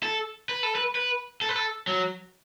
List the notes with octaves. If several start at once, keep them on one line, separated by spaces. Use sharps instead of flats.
A4
B4
A4
B4
B4
A4
B4
A4
F#3